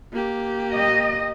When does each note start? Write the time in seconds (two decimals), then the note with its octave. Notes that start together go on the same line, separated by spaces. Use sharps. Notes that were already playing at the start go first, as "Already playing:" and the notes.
0.13 A#3 G4
0.74 D#5